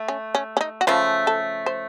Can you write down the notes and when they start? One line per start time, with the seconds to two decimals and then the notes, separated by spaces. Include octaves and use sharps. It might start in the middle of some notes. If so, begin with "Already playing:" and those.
Already playing: A3
0.08 C#4
0.35 C#4
0.57 C#4
0.61 D#4
0.81 F#4
0.87 C#3 F3 A3 F4
1.27 A4
1.66 C5